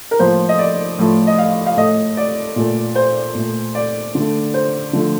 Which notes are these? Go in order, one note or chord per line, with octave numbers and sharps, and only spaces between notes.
A#4
A2 F3 A#3 C5
D#5
D5
A2 F3 A3
D#5
F5
F5
A2 A3 D#5
D5
A#2 A3
C5
A#2 A3
D5
D3 A3
C5
D3 F3 A3